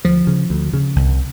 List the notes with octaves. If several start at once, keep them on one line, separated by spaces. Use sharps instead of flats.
D2 F3
C#3
D2
C#3
C2